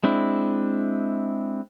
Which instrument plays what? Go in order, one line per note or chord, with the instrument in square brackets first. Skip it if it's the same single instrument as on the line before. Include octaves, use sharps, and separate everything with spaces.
[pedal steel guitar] G#3 C4 D4 E4